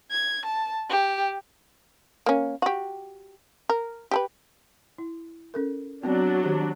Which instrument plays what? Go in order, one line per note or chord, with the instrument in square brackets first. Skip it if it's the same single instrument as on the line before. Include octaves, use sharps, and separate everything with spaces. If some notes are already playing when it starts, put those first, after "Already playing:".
[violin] G#6
A5
G4
[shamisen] A#3 C#4
F#4 G4
A#4
G4 A4 B4
[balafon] E4
C#4 A4 A#4
[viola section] F#3 D4 [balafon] B3 C4 D5
[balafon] D#3 G4